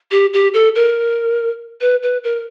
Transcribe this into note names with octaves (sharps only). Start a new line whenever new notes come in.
G4
G4
A4
A#4
B4
B4
A#4